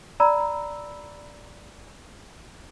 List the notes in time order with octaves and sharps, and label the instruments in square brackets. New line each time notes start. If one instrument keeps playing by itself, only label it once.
[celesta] D5 A#5 B5 E6